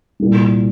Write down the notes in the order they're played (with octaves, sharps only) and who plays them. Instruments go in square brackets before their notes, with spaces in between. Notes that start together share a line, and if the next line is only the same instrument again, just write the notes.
[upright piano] C2 A#2 G3